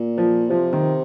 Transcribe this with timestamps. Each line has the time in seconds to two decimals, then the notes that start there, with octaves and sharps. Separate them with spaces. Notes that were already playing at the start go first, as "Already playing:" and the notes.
Already playing: A#2
0.18 F3
0.49 C3 F3
0.73 D#3